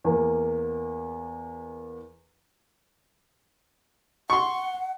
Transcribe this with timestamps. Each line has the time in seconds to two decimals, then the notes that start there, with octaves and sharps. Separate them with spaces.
0.04 E2 A#3
4.30 F#5 C6 C#6